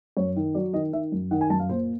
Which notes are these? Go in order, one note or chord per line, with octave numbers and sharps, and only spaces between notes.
F#2 C#5
D#3
F#3 D5
D#3 D#5
D#3 E5
F#2
D#3 F#5
G#5
F#2 A5
F5
A#2 C5